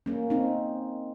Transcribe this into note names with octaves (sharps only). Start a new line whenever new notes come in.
A#3 C#4
C4 D#4